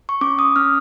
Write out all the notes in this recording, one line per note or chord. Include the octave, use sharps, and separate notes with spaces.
C#6
C#4 D6
D#6
C#4 F6